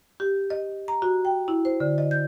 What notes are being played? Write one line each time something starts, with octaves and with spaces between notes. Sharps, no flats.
G4
D#5
A#5
F#4
G5
E4
C5
D3
D#5
G6